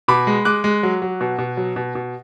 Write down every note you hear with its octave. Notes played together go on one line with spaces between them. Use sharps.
B2 B5 D6
G#3
G#3 D6 F#6
G#3
F#3
F#3
B2
B2
F#3
B2
B2